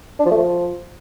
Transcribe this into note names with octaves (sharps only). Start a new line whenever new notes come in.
D4
F3
A3
F3